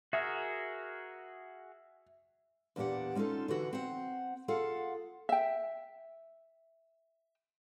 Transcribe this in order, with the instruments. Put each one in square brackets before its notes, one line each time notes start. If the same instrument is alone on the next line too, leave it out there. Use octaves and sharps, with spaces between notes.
[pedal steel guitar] F#4 G#4 A#4 [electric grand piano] E5
[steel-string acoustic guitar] E2 A#2 D4 G4 F#5
G#3 C#4 D#4 F4 A4
D3 E3 F#4
C4 F#5
F4 G#4 A4 F5 F#5
[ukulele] E5 G5